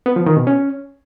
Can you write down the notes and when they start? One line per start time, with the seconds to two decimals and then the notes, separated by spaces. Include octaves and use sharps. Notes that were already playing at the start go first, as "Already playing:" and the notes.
0.06 B3
0.16 F3
0.26 D#3
0.37 B2
0.47 C#4